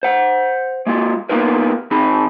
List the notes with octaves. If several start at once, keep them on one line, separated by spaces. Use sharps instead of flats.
C5 F#5
G#3 A#3 F4
A#3 B3 D#4 F4 A#4 B4
D#3 C4 D#4 G#4 B5